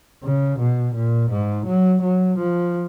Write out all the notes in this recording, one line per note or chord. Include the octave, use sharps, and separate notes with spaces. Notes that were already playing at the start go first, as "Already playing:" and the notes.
C#3
B2
A#2
G#2
F#3
F#3
F3